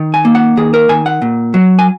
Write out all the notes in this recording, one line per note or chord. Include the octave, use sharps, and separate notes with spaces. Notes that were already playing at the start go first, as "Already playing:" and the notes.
Already playing: D#3
G#5
A#3
F#5
D#3 G#4
A#4
D#3 G#5
F#5
A#2
F#3
G#5